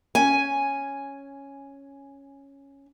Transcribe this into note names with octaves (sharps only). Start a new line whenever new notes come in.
C#4 G#5